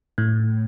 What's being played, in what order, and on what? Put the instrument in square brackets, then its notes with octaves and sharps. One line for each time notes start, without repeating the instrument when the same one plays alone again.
[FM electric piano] A2